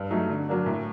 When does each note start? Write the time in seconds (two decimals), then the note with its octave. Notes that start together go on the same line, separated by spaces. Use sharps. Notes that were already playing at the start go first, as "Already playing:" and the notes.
Already playing: G2
0.11 F#3 A3 D#4
0.30 D3
0.48 F#3 A#3 D4
0.66 A2